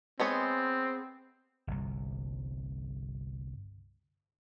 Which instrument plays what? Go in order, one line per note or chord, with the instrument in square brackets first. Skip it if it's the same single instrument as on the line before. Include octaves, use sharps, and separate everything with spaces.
[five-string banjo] G#3 B3 C#5 [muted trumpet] C4
[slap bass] G1 C2